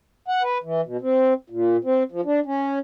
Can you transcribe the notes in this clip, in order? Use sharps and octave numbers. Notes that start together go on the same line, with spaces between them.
F#5
B4
E3
B2
C4
A#2
C4
F3
D4
C#4